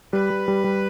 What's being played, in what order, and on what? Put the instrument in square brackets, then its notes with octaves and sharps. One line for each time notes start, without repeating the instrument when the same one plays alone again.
[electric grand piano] G3 [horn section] B4
[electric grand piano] G3
G3
G3